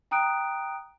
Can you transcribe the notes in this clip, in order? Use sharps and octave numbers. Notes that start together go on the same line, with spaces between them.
G5 A#5 D#6 F#6 D7